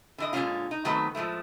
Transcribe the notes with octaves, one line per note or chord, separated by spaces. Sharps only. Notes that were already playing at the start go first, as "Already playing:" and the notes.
D3 E3 D#5
A#2 D3 F3 G#3 C#4 F4
D#4
D#3 F#3 A3 B3 C4 B4
A2 F3 G#3 A3